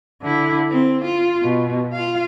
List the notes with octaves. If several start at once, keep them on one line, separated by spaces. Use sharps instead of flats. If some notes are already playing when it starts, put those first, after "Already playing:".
D3 E4
C4
F4
B2
F4 F5